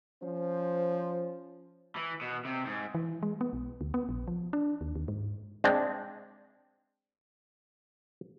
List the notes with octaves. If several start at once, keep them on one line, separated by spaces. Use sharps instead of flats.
F3 C#4 C5
E3
B2
C3
G#2
E3
G#3
B3
B1
D2
B3
A#1
F3
D4
D#2
D#2
G#2
G#3 C4 D4